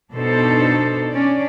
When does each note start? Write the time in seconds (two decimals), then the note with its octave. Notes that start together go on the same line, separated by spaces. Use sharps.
0.13 B2 D4 D#4 A4 C5
1.10 C#4 D4 D5